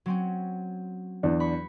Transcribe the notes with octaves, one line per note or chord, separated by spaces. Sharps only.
F#3 C4 C#4
E2 D4
B5 C#6